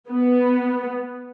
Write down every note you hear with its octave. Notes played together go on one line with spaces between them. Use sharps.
B3